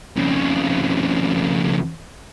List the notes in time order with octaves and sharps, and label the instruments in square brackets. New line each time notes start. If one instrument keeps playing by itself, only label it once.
[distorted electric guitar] F2 C#3